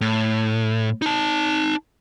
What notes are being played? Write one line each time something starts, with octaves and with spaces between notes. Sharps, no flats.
A2
D#4 A5